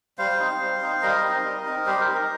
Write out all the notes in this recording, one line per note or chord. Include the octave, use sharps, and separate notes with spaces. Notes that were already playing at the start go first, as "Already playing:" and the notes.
G3 C5 F5
C4 D#4
G3
C4 D#4
G3 A#4 D#5
C4 D#4
G3
C4 D#4
G3 G4 C5
A#4
D#4
A#4